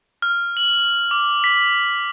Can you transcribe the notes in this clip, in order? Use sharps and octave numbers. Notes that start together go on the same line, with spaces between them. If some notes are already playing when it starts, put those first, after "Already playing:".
F6
F#7
D6
B6